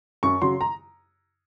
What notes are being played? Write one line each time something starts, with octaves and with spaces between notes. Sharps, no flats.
F#2 C#6
C#3 F#3 C6
A#5